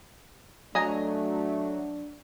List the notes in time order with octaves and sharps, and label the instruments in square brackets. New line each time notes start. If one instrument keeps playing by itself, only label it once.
[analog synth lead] F#3 [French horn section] A3 [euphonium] D4 [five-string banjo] D#5 G#5 A#5